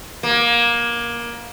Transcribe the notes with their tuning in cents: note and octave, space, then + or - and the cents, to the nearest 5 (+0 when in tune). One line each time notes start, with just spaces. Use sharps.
A#3 +20